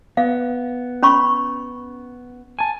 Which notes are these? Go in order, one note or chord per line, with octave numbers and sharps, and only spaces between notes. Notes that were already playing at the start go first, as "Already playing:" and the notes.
B3 F5
C#4 B5 C#6
G#5 A5